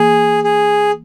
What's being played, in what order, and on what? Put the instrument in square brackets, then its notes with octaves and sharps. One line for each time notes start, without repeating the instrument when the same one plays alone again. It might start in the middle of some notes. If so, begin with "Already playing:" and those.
Already playing: [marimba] E3 A#3 [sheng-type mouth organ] G#4
[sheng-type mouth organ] G#4